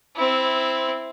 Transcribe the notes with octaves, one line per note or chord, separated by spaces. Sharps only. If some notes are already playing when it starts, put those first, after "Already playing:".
C4 E4